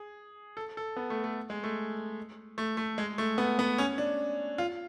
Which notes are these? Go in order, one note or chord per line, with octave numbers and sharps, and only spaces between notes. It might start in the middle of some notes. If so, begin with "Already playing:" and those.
Already playing: G#4
A4
A4
B3
A3
A3
G#3
A3
A3
A3
G#3
A3
B3
B3
C#4
D4
F4